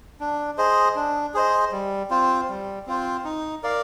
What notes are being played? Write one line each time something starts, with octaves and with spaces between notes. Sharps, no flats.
D4
G#4 C5 D#5
D4
G#4 C5 D#5
G3
C4 F4 C5
G3
C4 F4 C5
D#4
A#4 D5 F5